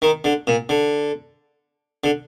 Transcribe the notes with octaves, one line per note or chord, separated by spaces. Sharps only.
D#3
D3
A#2
D3
D3